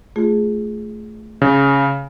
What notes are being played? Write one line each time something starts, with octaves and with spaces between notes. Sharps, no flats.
A3 F4 G#4
C#3